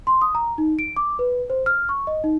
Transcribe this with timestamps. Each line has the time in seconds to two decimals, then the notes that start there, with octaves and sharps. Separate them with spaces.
0.07 C6
0.22 D#6
0.35 A#5
0.58 D#4
0.79 D7
0.96 D6
1.19 B4
1.50 C5
1.66 F6
1.89 C#6
2.07 D#5
2.24 D#4